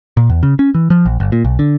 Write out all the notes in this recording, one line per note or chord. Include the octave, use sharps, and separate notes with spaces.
A#2
E2
C#3
C#4
E3
F3
A#1
G1
A#2
B1
D3